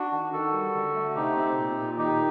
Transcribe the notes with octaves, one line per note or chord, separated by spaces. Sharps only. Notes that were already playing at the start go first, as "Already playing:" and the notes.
Already playing: D4 F#4
D#3
D#3 F#4 A4
G3
D3
A3
C3 D#4 G4
C4
A#2
A#2
D#3 D#4 G4